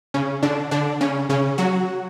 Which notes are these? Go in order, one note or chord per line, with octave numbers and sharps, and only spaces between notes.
C#3 C#4
D3 D4
D3 D4
C#3 C#4
C#3 C#4
F#3 F#4